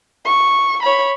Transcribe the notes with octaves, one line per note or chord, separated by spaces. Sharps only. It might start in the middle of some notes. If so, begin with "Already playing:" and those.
C#6
C#5 B5